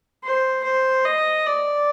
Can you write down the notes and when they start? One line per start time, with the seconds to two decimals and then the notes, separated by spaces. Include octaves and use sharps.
0.24 C5
0.64 C5
1.05 D#5
1.46 D5